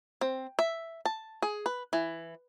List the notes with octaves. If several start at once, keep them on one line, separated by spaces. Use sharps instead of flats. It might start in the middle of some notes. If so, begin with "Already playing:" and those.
C4
E5
A5
G#4
B4
E3